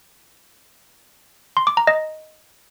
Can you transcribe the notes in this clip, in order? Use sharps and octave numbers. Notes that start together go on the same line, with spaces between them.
C6
D6
A#5
D#5